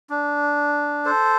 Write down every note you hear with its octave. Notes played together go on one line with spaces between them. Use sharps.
D4
A4 C5